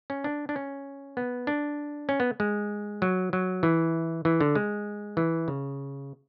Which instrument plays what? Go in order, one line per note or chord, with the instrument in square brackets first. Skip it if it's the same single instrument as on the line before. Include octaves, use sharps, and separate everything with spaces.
[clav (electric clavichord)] C#4
D4
D4
C#4
B3
D4
C#4
B3
G#3
F#3
F#3
E3
E3
D3
G#3
E3
C#3